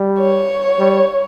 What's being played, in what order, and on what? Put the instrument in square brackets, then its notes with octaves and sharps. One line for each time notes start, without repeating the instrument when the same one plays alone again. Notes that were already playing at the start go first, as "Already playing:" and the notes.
Already playing: [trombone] G3
[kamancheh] C#5
[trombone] G3